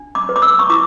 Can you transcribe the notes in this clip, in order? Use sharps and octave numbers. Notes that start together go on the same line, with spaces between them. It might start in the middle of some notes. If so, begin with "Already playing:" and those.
Already playing: D4
D6
B4
D6
E6
C#6
E4 D6